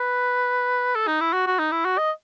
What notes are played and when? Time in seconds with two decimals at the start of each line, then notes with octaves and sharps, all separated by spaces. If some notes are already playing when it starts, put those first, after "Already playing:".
Already playing: B4
0.95 A4
1.07 D#4
1.21 E4
1.33 F#4
1.47 F#4
1.59 D#4
1.72 E4
1.85 F#4
1.98 D#5